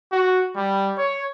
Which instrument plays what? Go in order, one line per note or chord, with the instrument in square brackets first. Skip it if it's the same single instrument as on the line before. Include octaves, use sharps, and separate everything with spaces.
[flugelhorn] F#4
G3
C#5